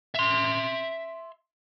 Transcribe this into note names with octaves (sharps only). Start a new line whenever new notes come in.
E5 C6